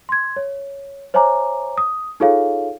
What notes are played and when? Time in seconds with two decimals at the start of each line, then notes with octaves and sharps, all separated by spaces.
0.09 C6 G#6
0.36 C#5
1.14 C5 C#5 E5 G#5 A#5 D6
1.78 D#6
2.20 D#4 F4 G#4 A4 C#5 F5